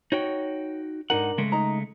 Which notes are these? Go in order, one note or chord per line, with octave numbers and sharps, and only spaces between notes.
D#4 F#4 C#5 G5
G#2 D4 D#4 A#4 F#5
C#3 G#3 A3
D#4 A#5